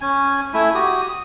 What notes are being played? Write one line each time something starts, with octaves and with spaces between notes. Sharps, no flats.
C#4 G#5
A3 E4 G#5
F#4 G4 D#6
D#6